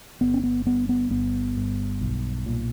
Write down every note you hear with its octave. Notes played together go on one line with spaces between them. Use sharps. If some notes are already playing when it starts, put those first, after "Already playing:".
G1 B3
C#4
B3
G2 B3
B3
G1 B3
G2
B1
A#2